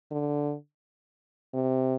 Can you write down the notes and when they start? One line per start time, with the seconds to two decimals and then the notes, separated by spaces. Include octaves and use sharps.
0.11 D3
1.54 C3